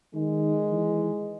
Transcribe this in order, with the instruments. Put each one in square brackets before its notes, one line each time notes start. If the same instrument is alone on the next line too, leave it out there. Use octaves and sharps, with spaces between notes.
[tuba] D#3 [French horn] G#3
[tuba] E3